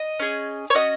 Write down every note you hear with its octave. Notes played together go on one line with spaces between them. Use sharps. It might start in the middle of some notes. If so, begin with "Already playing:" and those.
Already playing: D#5
C#4 G#4
C#5
C#4 F#4 D#5